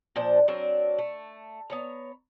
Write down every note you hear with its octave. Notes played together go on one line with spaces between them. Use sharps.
A#2 F3 D4 C5
F#3 C4 D4 A#4
A3
B3 C#5 A#5